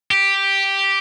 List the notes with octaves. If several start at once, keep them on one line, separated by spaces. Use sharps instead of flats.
G4